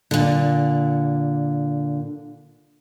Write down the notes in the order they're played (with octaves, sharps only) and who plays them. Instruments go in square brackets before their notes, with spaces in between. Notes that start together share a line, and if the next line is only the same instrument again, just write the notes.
[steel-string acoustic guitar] A#2 D3